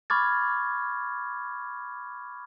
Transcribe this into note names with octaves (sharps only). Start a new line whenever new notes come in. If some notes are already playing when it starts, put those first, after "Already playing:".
B5 C#6 D6 F6 G#6 A6